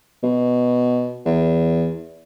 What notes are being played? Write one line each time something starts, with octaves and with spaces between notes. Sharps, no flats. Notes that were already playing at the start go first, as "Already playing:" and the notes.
B2
E2